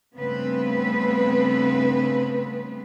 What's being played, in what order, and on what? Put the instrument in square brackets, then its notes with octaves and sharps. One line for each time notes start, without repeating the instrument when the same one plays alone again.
[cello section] G2 C#3 A3 B3 C4 B4